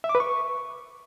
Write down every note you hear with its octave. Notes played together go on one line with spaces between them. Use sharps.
E5
D6
B4
C#6